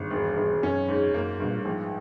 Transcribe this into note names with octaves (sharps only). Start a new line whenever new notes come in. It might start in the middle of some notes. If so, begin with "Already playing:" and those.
Already playing: G#1 G2
E1
E1
F#2 C#4
G#2
F#2 A#3
G2 B2
A#2
A2
A#1 G#2